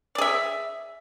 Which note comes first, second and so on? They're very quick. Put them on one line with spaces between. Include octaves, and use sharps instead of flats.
D5 G#4 E5